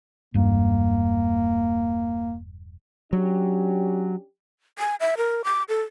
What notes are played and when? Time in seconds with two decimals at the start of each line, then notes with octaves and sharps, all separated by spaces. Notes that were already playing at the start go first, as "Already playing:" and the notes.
0.34 E1 G2 A#3
3.13 F#3 C#4 D4 G4
4.79 G#5
5.00 E5
5.17 A#4
5.44 D6
5.69 A4